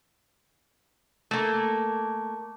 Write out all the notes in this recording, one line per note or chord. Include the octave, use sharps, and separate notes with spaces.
A3 A#3